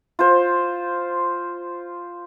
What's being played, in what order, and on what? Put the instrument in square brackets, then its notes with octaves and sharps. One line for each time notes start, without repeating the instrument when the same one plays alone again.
[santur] F4 C5